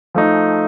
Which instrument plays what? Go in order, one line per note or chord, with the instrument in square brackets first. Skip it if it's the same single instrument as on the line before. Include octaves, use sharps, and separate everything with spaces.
[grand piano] F3 A3 D#4